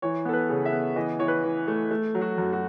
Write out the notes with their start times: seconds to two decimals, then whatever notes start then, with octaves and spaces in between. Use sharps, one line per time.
0.02 E3 C#5
0.25 B3 A4
0.33 B4
0.49 C#3
0.65 E5
0.72 B3
0.96 E3 D#5
1.19 E3 C#5
1.28 B4
1.43 E3
1.68 A3
1.91 A3
2.15 F#3
2.21 F#4
2.38 F#2
2.53 F#4